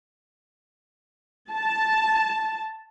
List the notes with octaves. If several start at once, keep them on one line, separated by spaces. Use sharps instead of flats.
A5